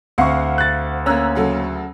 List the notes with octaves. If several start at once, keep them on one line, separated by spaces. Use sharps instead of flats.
D2 C4 F5 F#5 C#6
F#6 A6
A#3 C#4 A#5 E6 F#6
C#3 F#3 A4